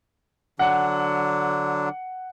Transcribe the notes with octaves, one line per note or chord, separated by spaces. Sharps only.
D3 F#3 D4 F#5